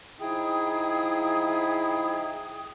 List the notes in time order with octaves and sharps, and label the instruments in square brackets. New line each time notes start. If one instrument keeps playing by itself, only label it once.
[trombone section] F3 D#4 E4 [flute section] G#4 G5 D#6